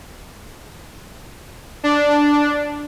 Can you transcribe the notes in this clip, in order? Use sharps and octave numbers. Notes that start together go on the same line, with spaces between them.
D4